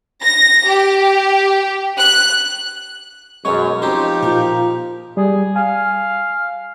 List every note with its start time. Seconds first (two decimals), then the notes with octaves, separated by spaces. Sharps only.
0.22 A#6
0.68 G4
1.99 F#6
3.45 F#2 B2 G#3 C#5 C#6
3.82 F3 C4 C#4 D#4 G4 C5
4.23 A#2 F4 A#4
5.17 G3 G#4
5.56 F5 G#5